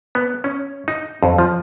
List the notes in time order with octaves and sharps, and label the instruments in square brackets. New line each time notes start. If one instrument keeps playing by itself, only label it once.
[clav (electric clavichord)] B3
C#4
D#4
F2
F3